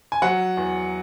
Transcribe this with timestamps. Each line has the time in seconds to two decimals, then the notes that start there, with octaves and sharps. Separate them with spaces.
0.12 G#5
0.22 F#3 F#5
0.57 E2